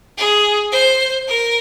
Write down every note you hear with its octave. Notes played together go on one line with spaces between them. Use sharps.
G#4
C5
A#4